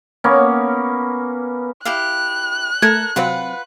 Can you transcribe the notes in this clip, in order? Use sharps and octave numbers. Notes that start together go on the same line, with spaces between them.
A#3 B3 C#4
E4 G4 F5 F#6
A3 A4 A#4 G#6
C3 F#3 C4 F4 B4 F#5